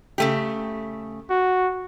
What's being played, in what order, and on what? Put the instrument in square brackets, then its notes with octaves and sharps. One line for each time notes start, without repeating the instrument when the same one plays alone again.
[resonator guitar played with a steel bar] C#3 A3 G4
[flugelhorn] F#4